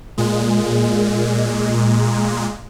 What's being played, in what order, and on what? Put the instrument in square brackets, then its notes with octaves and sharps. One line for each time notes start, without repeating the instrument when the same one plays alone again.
[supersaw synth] A#2 G#3